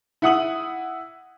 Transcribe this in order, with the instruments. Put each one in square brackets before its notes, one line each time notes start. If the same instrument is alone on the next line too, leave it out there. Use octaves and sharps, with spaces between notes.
[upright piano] E4 F#5 D#6 F#7